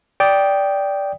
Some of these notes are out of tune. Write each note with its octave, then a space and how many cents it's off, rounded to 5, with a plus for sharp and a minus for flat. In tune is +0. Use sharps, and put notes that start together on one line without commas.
D5 -10 G5 +0 D#6 +0